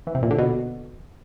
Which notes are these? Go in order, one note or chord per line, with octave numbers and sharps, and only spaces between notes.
E3
C3
A#2
D3
B2